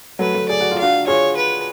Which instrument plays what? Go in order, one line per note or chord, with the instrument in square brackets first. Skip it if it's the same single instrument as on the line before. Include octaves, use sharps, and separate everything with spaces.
[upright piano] F#3 A3 [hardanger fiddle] B4
[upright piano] F#3 A3
[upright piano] G#4 [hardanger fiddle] D5
[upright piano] F#4
F4
[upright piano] D4 F#4 [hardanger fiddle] F5
[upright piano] F4 G#4 [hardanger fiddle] C#5
[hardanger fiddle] B4